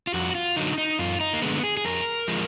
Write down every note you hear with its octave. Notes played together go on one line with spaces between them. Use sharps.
F4
F2 F#4
F4
D3 F#3 D#4
D#4
F#2 F4
D#4
A#3
D3 G#3 B3
G#4
G#4
F2 A#4
F3 G#3